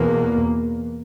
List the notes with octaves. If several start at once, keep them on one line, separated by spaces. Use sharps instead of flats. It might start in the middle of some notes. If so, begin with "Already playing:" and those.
Already playing: E2 B2 A#3